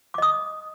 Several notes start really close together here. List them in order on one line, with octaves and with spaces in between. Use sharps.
D6 D#5 D#6